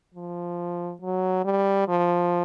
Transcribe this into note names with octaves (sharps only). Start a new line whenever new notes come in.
F3
F#3
G3
F3